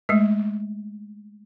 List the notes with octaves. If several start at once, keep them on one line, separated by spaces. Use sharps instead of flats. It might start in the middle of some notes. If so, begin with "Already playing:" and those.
G#3 A3